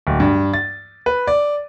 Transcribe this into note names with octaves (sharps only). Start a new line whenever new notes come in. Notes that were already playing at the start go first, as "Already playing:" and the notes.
D1
G2
A6
B4
D5